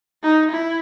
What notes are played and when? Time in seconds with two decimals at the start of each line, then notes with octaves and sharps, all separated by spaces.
0.23 D#4
0.51 E4